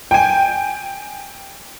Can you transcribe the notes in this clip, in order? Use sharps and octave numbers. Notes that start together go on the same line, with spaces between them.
G5 G#5